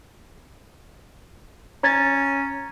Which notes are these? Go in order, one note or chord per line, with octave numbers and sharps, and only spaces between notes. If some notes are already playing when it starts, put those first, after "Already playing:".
C#4 A#5 G#6 A6